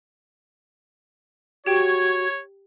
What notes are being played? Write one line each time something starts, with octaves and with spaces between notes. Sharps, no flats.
F#4 G4 C#5 G5 G#6